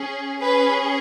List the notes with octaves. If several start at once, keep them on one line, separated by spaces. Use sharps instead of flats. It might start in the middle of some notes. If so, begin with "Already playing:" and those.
Already playing: C#4 G#4
C#4 G#4 B4